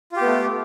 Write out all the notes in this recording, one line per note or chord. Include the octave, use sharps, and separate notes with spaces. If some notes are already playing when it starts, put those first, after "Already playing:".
A3 B3 F4 G4